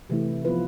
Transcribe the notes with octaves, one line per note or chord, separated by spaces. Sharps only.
C3 E3 A3 E4
F3 B3 F4 B4